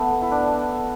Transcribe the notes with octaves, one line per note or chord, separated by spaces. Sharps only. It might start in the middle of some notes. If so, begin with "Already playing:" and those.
Already playing: A3 B3
E4
D4